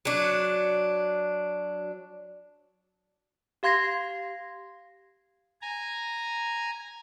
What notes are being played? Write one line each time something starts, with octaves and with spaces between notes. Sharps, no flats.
F#3 D4
G4 F5 C6 G#6 A#6 C7
G#5 A#5